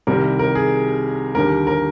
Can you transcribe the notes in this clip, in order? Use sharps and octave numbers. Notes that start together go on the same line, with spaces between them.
C2 C3 D#3 G3 A#4
A#4
G#4
D#2 D3 G3 A#4
A#4